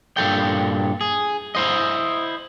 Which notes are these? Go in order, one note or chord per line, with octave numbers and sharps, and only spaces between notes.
G2 A#2 A4 G5
G#4
E4 C5 D#5